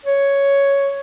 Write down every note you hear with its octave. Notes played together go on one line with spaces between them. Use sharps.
C#5